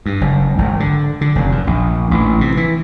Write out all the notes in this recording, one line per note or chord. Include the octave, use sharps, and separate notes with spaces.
G2
F#1
G#1
D3
D3
F1
F#2
A#1
A1
C3
E3